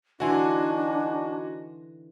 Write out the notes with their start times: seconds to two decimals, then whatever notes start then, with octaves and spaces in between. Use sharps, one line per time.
0.20 D3 E3 D4 D#4 F#4 G#5 C6